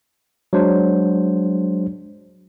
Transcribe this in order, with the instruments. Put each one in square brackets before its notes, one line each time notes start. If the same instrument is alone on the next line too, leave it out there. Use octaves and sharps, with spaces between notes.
[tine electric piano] F#3 G#3 D4 C5